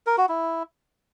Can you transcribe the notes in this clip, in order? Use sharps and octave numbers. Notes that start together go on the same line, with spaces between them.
A#4
F#4
E4